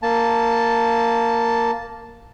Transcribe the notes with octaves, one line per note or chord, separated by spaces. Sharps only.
A#3 A5